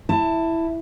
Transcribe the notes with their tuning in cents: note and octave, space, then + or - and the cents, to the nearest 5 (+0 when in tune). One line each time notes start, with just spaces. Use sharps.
E4 +0 A5 +20